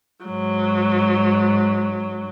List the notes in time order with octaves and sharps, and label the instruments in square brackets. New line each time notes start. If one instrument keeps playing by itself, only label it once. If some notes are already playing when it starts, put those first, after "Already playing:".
[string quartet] G#2 F#3